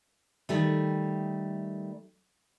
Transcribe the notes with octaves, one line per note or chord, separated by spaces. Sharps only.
D#3 G3 A3